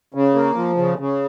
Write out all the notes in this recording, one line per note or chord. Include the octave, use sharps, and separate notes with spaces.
C#3
A#3
F3
C#3
C#3